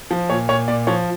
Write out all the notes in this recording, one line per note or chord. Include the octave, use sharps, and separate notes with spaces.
F3
A#2 C#5
A#2 C#5
A#2 D5
F3 C#5